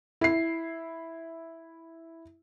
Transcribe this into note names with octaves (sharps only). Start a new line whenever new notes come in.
E4 C7